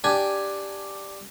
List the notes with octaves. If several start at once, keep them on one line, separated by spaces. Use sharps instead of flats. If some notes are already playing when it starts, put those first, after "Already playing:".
D4 G4 G#5